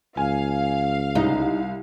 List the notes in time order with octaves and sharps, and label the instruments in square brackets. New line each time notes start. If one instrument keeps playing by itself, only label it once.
[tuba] C#2 [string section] F5 [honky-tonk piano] G#5
[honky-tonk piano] C2 [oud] D#4